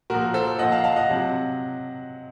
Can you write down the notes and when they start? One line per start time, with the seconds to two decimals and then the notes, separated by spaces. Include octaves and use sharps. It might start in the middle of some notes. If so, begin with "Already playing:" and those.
0.10 A#2 F3 F#4 A#4
0.34 A4 C5
0.59 A#2 F3 D#5 F#5
0.72 F5 A5
0.78 F#5
0.84 F5 A5
0.96 D#5 F#5
1.09 C3 F#3